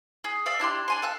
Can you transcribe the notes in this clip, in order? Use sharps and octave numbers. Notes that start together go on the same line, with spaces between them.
G#4
D5 E5 F5 E6
D4 E4 G4 C6
D4 G#5 C6
A4 F5 F#6